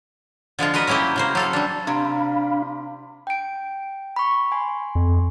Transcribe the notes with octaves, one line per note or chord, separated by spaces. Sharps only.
D3 F3 G#3 F4
F#4 A#4 B4 D#5
F#3 A#3 C#4 E4 G4
C#3 A#3 C5
F#3 A4 F5
G3 D4
C3 D4 F5 B5
G5 D7
B5 C#6
G#5 C6
F2